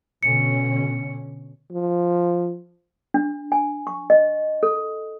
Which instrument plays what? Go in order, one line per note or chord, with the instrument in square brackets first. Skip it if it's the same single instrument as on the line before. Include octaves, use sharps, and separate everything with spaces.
[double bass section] B2 D3 C#4 [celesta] C#7
[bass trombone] F3
[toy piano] D4
G#5
C#6
D#5
A4